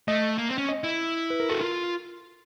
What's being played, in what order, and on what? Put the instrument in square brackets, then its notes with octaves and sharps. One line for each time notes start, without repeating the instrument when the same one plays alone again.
[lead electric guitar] A3 [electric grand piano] D#5
[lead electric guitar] A#3
C4
C#4
[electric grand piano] D#5
[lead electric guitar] E4
[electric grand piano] B4
A#4
[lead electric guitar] F#4 [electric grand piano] A4
[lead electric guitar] F4 [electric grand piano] A#4